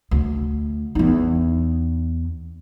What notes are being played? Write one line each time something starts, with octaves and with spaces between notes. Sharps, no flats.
D2
E2 D#4